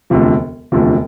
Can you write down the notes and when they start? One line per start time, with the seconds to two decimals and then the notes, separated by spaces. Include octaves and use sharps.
0.10 E1 D2 C3 F3
0.72 E1 D2 C3 F3